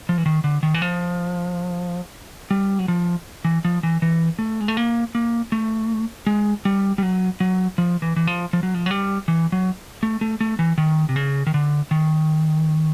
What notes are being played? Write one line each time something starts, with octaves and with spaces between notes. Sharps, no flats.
F3
E3
D#3
D3
D#3
E3
F3
G3
F#3
F3
E3
F3
E3
E3
A3
G#3
A3
A#3
A#3
A3
G#3
G3
G3
F#3
F#3
F3
E3
E3
F3
F3
F#3
F3
F#3
G3
E3
F#3
A3
A3
A3
E3
D#3
C3
C#3
D#3
D3
D#3